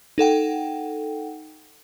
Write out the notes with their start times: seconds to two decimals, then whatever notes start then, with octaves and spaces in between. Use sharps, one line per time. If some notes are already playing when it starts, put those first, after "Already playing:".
0.18 D#4 A4 F#5 G5